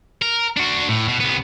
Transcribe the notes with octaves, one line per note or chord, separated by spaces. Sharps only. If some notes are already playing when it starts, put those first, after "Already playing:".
A#4
D4 F#4
A2
B2
C2 B3